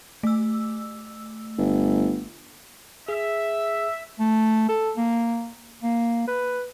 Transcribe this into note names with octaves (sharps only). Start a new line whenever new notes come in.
A3 E6
G1
G#4 E5
A3
A4
A#3
A#3
B4